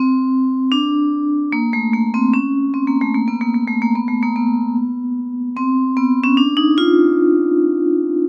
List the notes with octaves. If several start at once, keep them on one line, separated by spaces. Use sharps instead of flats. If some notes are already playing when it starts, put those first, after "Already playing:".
Already playing: C4
D4
A#3
A3
A#3
C4
C#4
C4
A#3
A3
A#3
B3
A#3
A#3
A3
A#3
B3
A3
A#3
B3
C4
B3
C#4
D4
D#4
F4